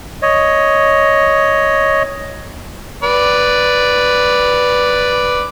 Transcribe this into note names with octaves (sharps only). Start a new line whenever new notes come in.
C#5 D#5
B4 D5